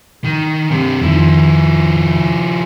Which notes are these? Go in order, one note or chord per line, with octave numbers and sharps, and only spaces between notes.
D#3
G2 C3
F2 D#3 F3 E4